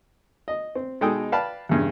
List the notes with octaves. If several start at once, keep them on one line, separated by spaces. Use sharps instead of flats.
D#5
C4
B2 G#3 D#4 A4 G5 D#6
B4 D5 F5 G5 A5 B5
E2 G2 C#3